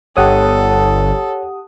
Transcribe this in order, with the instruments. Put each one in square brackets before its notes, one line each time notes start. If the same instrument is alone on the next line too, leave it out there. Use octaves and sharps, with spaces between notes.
[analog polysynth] G1 [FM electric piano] G4 F#5 D#6 [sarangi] A4 [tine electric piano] C#5